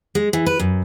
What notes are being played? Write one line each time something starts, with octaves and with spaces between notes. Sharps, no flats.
G#3
E3
B4
F#2